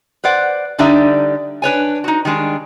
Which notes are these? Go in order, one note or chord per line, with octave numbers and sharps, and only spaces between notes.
B4 C5 D5 F#5
D3 G3 D4 D#4 D5 E5
D4 B4 C#5 G#5
D#4 F#4
D#3 G3 G#3 D4